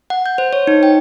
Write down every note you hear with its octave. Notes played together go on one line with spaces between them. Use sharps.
F#5
G6
C5
C#5
D#4
G5